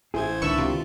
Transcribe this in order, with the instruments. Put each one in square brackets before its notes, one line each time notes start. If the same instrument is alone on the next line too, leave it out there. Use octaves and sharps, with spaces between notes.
[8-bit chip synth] A1 C5 G#6 [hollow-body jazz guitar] E4 G#4
[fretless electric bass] C#2 D#3 D4 [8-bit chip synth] B4 E5 A5 [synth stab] C#6 E6
[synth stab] C3 [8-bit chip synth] F4